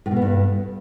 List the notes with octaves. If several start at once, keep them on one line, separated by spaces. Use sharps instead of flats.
A2
B2
B3
G2